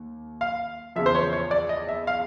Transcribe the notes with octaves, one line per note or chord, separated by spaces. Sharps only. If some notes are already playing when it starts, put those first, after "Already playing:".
Already playing: D#2
F5
E2 C#3 F3 E5
C5
C#5
C#5
D5
D#5
E5
F5